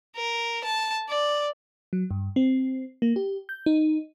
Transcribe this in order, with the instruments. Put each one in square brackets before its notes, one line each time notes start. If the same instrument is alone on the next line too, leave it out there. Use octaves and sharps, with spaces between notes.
[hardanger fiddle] A#4
A5
D5
[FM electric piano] F#3
G2
C4
A#3
G4
G6
D#4